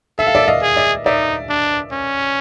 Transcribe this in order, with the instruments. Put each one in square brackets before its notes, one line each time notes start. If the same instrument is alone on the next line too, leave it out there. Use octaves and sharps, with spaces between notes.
[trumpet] A4 [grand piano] E5
[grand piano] F5
D5 E5
D#5 F5
[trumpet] G#4
[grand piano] D5 E5
[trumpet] D#4 [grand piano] D5 E5
[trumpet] D4
C#4